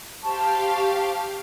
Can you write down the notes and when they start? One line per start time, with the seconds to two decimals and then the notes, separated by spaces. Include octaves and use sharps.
0.23 G4 C5 F5 A5 C#6